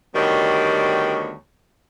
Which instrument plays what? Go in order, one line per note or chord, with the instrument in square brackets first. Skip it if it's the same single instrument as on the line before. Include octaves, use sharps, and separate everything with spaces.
[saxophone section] D2 D#3 G3 B3 C#5